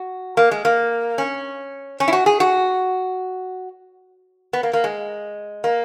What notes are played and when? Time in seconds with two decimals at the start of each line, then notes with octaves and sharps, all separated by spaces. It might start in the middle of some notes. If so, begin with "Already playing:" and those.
Already playing: F#4
0.37 A#3
0.51 G#3
0.65 A#3
1.18 C#4
2.00 C#4
2.08 E4
2.13 F#4
2.26 G#4
2.40 F#4
4.53 B3
4.63 A#3
4.73 A#3
4.84 G#3
5.64 A#3